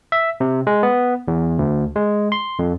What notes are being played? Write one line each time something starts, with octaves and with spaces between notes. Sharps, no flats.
E5
C3
G#3
B3
E2
D2
G#3
C6
F2